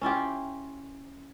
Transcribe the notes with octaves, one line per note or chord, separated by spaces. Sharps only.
C#4 E4 F4 G4